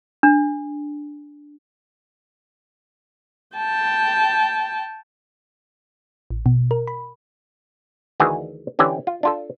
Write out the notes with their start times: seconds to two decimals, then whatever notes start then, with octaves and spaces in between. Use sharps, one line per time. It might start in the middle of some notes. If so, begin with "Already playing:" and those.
0.23 D4
3.57 G5 A5
6.30 A1
6.46 B2
6.71 A#4
6.87 B5
8.20 D2 D#3 E3 F#4 G#4 G#5
8.79 D3 E3 C#4 G4
9.07 F4
9.23 D4 F4 A4